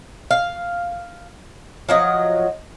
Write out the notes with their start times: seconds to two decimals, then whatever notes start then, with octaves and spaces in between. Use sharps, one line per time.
0.31 F5
1.89 F3 F#3 D#5